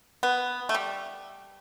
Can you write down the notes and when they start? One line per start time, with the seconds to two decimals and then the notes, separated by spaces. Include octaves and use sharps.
0.23 B3
0.69 A3
0.75 G3